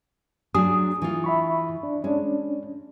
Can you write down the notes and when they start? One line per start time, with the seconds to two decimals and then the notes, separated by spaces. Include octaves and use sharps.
0.55 F#3 D4 G#4 D#6
1.02 E3 F4
1.24 E5 B5 C#6
1.83 D4
2.04 G#3 C#4 D4